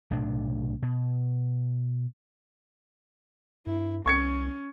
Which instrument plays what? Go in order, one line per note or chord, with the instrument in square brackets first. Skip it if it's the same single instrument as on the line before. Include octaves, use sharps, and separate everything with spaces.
[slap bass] B1 A2 C3 D4
B2
[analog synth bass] G2 [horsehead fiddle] E4
[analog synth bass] C2 [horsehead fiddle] C#4 [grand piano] C#6 G#6 C#7